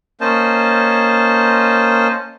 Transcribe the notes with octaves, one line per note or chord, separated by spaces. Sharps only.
A#3 C#4 C5 D#5 A5